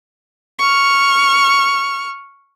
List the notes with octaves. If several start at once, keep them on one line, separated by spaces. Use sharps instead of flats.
C#6 F6